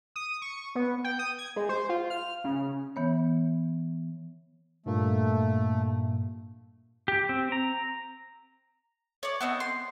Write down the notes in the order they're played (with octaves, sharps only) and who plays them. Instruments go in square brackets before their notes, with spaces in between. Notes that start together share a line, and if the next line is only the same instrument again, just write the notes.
[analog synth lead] D#6
C#6
B3
G5
D#6
G#6
G#3
C5
F4
F6
C#3
[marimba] E3 B3 C#5
[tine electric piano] G2 A#2 A#3 [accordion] A3
[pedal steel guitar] G4
C4
A#5
[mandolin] C#5 D5
B3 C4 D#4
C6